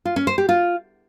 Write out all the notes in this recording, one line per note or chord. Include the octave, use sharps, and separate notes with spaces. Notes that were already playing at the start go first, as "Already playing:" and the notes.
F4
C#4
C5
G4
F4